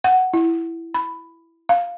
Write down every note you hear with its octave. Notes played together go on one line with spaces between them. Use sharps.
F#5
E4
B5
F5